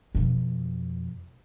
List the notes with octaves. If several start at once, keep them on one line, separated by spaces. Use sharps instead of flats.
F2 B2